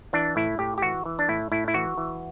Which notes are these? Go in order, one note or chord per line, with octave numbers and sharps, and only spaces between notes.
E3 D4
A2 E4
A2 G4
G4
E3 F#4
E3
D4
A2 E4
A2 E4
E4
E3 F#4
E3